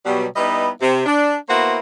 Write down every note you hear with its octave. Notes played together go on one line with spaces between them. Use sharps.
B2 F#3 G3
G3 B3 D#4 E4 B4 D#5
C3
D4
A#3 B3 E4 F#4 C5